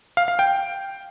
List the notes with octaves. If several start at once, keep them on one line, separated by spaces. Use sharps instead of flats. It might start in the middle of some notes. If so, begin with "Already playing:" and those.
F5
F5
G5